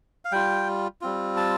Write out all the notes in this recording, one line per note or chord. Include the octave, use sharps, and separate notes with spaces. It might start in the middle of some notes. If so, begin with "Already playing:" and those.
F5
G3 F4 G5
G3 C4 F4
A5